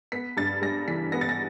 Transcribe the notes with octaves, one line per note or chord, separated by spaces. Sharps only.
B3 B6
G2 A6
G3 A#6
E3 B6
B3 A#6
A6
A#6